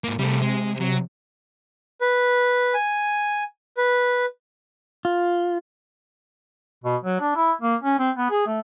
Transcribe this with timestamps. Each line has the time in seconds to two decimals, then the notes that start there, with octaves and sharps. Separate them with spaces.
0.04 G#2 A#3
0.19 C3 G3 A3
0.42 G#3
0.81 F#3
2.01 B4
2.74 G#5
3.77 B4
5.05 F4
6.84 B2
7.04 F#3
7.20 D4
7.36 E4
7.61 A#3
7.83 C#4
7.99 C4
8.17 B3
8.30 G#4
8.46 A3